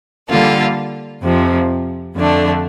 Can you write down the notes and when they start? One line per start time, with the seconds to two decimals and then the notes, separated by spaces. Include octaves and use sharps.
0.28 D3 G3 A#3 F4 A4
1.22 F2 C3 F3
2.15 F2 D3 A3 D4